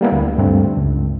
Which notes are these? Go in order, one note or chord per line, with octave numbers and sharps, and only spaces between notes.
G3 A#3 B3 E4
D2
G2 A3 C4
C#2